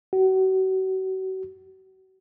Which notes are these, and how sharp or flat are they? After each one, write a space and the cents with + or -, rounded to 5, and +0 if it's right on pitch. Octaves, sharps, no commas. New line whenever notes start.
F#4 +35